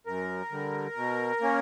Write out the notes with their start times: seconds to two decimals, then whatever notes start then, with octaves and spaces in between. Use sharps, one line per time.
0.06 F#2 A#4
0.52 D3 G3
0.96 B2
1.41 A#3 C#4